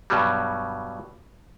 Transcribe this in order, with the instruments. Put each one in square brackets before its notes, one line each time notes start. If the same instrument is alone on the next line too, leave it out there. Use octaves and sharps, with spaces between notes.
[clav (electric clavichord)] G2 B2 F#3 G3